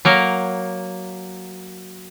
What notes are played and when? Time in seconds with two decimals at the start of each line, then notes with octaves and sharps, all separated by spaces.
0.05 F#3 A#3 A#4